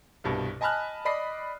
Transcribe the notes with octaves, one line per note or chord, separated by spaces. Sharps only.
C2 G2 B2
D#5 G#5 A5 B5 F6 F#6
D5 D#5 B5 D#6 C7